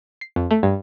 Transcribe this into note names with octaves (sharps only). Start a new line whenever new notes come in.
C7
F2
A3
G2